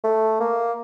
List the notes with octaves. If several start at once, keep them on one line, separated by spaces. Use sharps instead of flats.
A3
A#3